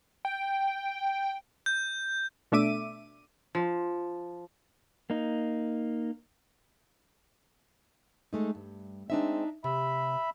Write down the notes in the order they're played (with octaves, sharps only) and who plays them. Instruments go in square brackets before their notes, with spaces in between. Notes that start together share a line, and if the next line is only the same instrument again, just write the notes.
[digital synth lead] G5
[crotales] G6
[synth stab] B2 A3 D4 E5 D6 D#7
[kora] F3
[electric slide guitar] A#3 D#4
[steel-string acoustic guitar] G#3 A3 D#4
G2
[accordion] G#3 C4 [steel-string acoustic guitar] D4 D#4 E5
[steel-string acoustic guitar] C3 [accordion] E5 B5